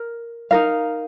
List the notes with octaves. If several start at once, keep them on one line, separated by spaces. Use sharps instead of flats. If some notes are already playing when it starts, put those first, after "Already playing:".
Already playing: A#4
D#4 A#4 F5